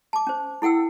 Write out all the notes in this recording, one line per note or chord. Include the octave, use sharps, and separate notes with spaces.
A5 D6
C#4 C5
E4 A4 F#5 G5 E6